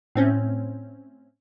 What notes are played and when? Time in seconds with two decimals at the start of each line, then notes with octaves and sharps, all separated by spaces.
0.15 A2 C4 C#4